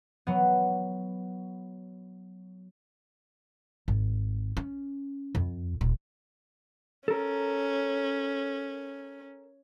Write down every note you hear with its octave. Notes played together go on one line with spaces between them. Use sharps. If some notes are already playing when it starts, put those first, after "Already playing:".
F#3 B3
G#1
C#4
F2
D#1
C#4 A4 A#4